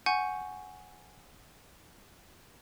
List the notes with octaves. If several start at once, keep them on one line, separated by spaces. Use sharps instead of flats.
F#5 G#5 C#6 G6